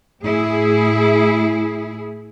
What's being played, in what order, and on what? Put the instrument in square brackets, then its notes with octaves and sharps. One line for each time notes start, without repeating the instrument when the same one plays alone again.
[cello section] A2 E4 G#4